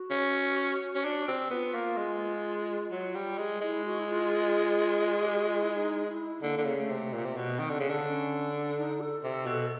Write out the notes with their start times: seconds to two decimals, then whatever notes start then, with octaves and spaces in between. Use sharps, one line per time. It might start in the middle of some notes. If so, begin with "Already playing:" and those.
Already playing: F#4
0.11 C#4
0.95 C#4
1.05 D4
1.28 C4
1.50 B3 F4
1.74 A#3
1.97 G#3
2.92 F#3
3.15 G3
3.38 G#3
3.61 G#3 E4
3.85 F#4
3.99 E4
4.08 F4
5.22 G4
5.34 F#4
5.47 F4
5.60 E4
5.72 E4
5.76 D#4
6.08 E4
6.42 D3 A#3
6.57 D3
6.65 C#3
6.77 A3
6.90 C3
7.13 A#2 A#3
7.25 C3
7.37 B2 C4
7.41 B3
7.59 D#3 C4
7.70 D3
7.80 C#3 C#4
7.90 D3 D4
8.06 D4
8.09 C#4
8.54 D4
8.77 D#4
9.01 A4
9.24 C3
9.46 B2